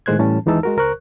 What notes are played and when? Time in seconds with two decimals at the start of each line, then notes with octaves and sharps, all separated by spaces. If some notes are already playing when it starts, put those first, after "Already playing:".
0.06 A2 D#3 G#3 C5 F#6 G#6
0.19 A2 E3 G3 C#4 A5
0.46 D#2 E3 G#3 D#4 A5 E6
0.63 G#3 F#4 A#4
0.77 C#2 A#4 C5 C#6 F#6